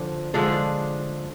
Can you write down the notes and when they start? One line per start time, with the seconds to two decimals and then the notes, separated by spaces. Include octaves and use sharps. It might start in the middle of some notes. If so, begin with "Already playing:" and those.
Already playing: D3 F3 D4
0.34 D3 F3 G#3 D4